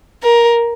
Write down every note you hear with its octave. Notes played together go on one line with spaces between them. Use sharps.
A#4